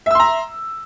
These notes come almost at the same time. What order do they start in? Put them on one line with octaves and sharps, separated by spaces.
E5 E6 C6 A#5